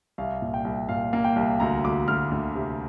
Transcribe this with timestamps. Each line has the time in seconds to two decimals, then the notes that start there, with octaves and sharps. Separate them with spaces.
0.18 C2 F5
0.42 A#2
0.54 G5
0.65 C2
0.89 A#2 F5
1.13 A#3
1.24 G5
1.36 C2
1.60 D2 A#5
1.84 D2 D6
2.08 D2 F6
2.32 D2
2.55 C3